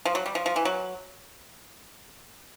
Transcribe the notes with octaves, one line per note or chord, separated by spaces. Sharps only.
F3
F#3
G3
F3
F3
E3
F#3